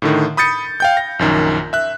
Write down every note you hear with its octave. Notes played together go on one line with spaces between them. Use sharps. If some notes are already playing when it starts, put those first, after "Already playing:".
A2 D3 D#3
B5 D#6 G6 A6 C#7
F5 G5 G6
A#6
A#1 F#2 D#3
E5 F#6